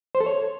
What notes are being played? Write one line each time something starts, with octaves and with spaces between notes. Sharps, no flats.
C5
A4
C#5